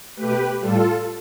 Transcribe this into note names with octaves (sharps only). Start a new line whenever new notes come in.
B2 A3 G4 B4
A2 G3 F4 A4